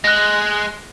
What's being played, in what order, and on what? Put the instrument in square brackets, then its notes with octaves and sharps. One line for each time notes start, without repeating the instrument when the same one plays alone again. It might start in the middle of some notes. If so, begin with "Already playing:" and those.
[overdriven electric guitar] G#3 [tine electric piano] F#6 A#6